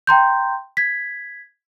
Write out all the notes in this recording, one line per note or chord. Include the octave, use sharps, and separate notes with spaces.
G5 A#5 C6 G6
G#6 B6